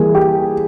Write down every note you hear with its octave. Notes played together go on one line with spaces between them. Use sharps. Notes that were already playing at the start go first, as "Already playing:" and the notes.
Already playing: E3 G3 A#3 G#4
G4